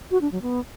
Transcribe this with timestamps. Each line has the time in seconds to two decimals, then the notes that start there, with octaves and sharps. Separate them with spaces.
0.11 F#4
0.21 D4
0.32 F#3
0.42 B3